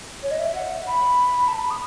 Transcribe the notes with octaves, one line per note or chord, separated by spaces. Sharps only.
C#5
D#5
E5
F#5
B5
A5
B5
D#6